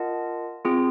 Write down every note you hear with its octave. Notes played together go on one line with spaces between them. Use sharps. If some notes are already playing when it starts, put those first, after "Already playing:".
Already playing: F4 A#4 D#5 F#5 A5
C4 F4 G#4